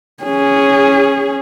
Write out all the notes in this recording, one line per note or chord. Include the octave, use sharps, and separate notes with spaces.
C#4 G#4